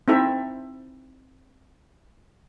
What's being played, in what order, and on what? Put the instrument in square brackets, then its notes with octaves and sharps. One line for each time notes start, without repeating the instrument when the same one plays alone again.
[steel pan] C4 D#4 E4 A4 E5